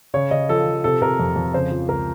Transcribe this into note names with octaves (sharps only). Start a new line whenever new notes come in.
C#3 C#5
C#3 D#5
F3 A4
F3
C3 A4
C3 A#4
F2
F2
C#3 C5
F3
C#2 A#4